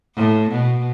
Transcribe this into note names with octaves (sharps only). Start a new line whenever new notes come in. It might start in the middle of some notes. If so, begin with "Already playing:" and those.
A2
B2